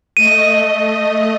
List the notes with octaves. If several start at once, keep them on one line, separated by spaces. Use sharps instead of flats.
A3 D#5 D#7